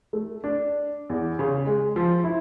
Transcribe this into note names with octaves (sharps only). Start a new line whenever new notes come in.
A3
D4
E2
C#3
G#3
F3
E4